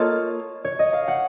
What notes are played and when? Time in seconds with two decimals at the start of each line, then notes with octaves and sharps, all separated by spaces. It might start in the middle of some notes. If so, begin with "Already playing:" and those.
Already playing: A#3 F4 A4 C#5 D#5
0.64 C#5
0.79 D#5
0.93 F5
1.08 F#5